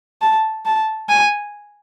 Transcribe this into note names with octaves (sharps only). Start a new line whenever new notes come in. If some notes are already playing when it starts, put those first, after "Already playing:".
A5
A5
G#5